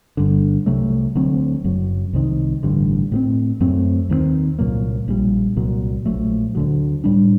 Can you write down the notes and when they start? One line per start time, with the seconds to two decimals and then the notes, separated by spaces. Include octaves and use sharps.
0.17 G1 G2 D3
0.66 C2 C3 F#3 A3
1.15 D2 D3 F#3 C4
1.64 F#1 F#2 F#3
2.13 C2 C3 D#3
2.63 A1 G2 D3
3.12 A2 F#3 C4
3.60 F#2 F#3 A3 C4
4.10 D#2 D#3 A3 C4
4.59 C2 A#2 F#3 A#3
5.08 A#1 A#2 G3
5.56 C2 A#2 F#3
6.06 A#1 A#2 F#3 A3
6.55 D2 D3 F#3
7.04 A2 G3 D4